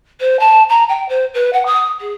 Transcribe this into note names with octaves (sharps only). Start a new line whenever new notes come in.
C5
A5
A#5
G5
C5
B4
F#5
D#6
G#4